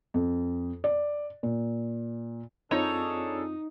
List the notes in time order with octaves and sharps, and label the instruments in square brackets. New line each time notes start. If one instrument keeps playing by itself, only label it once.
[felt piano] F2
D5
A#2
[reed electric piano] F#2 C4 F4 [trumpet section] D4 G#4 A4 [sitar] D#4 [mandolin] C#5